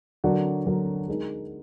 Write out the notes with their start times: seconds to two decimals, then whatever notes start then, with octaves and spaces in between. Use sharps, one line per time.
0.24 D3 F#3 D4 F#4 A#4
0.66 D3 F#3 D4 F#4 A#4
1.08 G#3 D#4 A#4